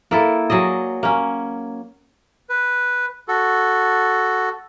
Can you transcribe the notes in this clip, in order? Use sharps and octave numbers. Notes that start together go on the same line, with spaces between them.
A#3 E4 A4
F#3 G#4 D5 D#5
A#3 C#4
B4
F#4 A4